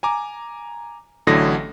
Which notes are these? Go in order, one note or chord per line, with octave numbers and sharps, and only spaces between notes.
G#5 A#5 D6
A1 A2 D3 F#3 D#6 A#6